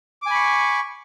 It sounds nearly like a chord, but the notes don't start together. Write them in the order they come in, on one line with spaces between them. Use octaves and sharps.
D6 G#5 B5 C#6